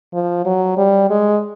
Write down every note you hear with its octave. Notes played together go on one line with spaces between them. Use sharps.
F3
F#3
G3
G#3